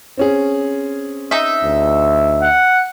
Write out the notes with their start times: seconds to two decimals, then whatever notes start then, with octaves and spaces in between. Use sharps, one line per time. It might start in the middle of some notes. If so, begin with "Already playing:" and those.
0.17 C4 C#4 G#4
1.31 D#4 E5
1.64 D2
2.42 F#5